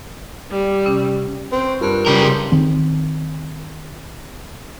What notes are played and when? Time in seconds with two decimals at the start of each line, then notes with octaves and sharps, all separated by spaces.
0.51 G3
0.86 C3 C#4
1.52 C4 B4
1.68 C#6
1.81 G2 F4 A#4 B4
2.06 C#3 G3 A#4
2.22 G#4 C6
2.52 D#3 C4